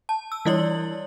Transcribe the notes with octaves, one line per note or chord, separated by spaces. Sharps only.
A5
E6
E3 G3 E4 C#5 D5 F#7